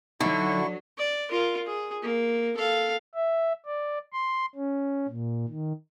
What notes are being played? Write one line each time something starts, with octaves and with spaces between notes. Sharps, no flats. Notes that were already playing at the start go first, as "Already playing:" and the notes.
D3 F#3 D#4 E4 C#6
D5
F4 A#4
G#4
A#3
A4 F5
E5
D5
C6
C#4
A#2
D#3